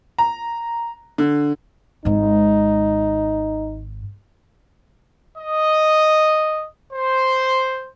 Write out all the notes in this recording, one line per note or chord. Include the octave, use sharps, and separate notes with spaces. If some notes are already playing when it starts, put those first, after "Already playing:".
A#5
D3
G#1 G#2 D#4
D#5
C5